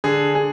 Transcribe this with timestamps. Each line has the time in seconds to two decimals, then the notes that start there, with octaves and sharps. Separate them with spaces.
0.04 D3 G#4
0.35 G#4